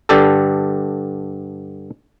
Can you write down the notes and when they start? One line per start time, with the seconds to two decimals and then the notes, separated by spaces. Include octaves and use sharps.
0.09 G2 D3 G4 A4